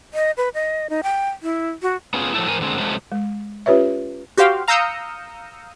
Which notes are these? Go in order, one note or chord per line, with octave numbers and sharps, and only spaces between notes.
D#5
B4
D#5
D#4
G5
E4
F#4
B3 C#4 F4 G#4
F3 F#3 A3 E4
G#2 D#3 E3 A#4 C5 G#5
D3 G#3 C4
C3 F3 F#3 G#3 A3 C#4
G#3
C#4 F4 G4 B4 C#5 E5
F#4 G4 C5 F5 G5
F5 A#5 D#6 E6 G6 C#7